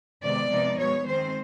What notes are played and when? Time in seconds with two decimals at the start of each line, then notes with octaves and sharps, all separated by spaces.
0.22 C3 D#3 G#3 B3 D5
0.50 C3 F3 G#3 B3 D#4
0.78 B2 G#3 B3 C#5
1.07 D#3 G#3 C4 C5